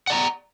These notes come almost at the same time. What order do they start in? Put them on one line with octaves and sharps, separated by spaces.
F#5 D5 A#5